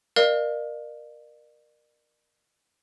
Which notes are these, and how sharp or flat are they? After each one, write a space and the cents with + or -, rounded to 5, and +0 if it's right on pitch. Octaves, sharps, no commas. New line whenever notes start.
A#4 +10 D5 +40 F5 -15